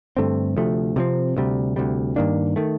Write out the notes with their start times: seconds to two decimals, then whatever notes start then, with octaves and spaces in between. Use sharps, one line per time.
0.17 G2 D3 A3 C4
0.57 D2 C3 F3 A3
0.96 C3 F3 C4
1.37 D2 C3 G3
1.76 D2 C3 G3
2.16 G2 D#3 A#3 D4
2.56 D#3 A3